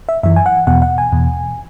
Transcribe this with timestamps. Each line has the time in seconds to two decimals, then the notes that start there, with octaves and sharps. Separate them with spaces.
0.09 E5
0.23 F#2 E3 E5
0.36 G#5
0.46 F#5
0.67 E2 B2 F#5
0.82 F#5
0.98 G#5
1.12 E2 B2